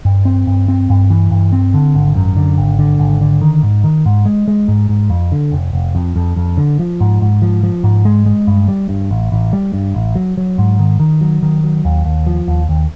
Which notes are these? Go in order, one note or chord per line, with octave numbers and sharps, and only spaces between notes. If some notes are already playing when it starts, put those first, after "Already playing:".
G2
C4
G2
C4
G2
E3
G2
C4
D3
G#1
F#2
D3
G#1
D3
G#1
D3
D#3
G#2
D#3
G#2
G#3
G#3
G#2
G#2
F2
D3
F1
F1
F2
F2
F2
D3
F3
G#2
G#2
F3
F3
G#2
G#3
G#3
G2
G3
G2
A1
A1
G3
G2
A1
F#3
F#3
G#2
D#3
D#3
F#3
D#3
F#3
D#2
D#2
F3
D#2
D#2